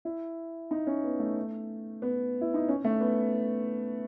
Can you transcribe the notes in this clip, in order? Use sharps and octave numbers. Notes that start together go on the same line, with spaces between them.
E4
D#4
C#4
B3
A3
B3
E4
D#4
C#4
A3
B3